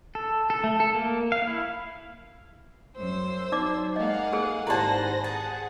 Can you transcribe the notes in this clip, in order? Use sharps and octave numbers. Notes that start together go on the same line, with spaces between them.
A4
A4
A3
A4
A#3
F5
E4
F#2 C5 E6
F#3 D#4 D5 D6
G#3 A#3 D#5 F5 F#5 G#5
G#4 A4
G#1 E4 G4 B4 C5 D5 A5 A#6
G#4 F#5 A5